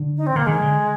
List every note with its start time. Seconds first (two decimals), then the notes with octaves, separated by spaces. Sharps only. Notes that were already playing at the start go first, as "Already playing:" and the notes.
Already playing: D3
0.17 D#4
0.27 C4
0.36 D3 A#3
0.46 D#3 G#3
0.62 D3